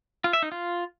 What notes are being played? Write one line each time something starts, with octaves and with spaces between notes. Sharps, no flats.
F4
E5
D#4
F4